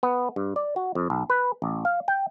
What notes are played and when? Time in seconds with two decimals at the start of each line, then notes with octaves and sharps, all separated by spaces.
0.03 B3
0.36 G2
0.56 D5
0.76 F#4
0.95 F2
1.10 B1
1.30 B4
1.62 A1
1.85 F5
2.08 G5